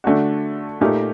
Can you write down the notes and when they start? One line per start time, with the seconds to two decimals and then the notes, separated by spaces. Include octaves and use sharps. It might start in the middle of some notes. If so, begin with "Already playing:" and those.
0.04 D3 A3 D4 F#4
0.81 A#2 A3 D#4 G4 A#4